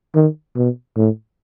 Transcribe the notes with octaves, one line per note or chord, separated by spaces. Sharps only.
D#3
B2
A2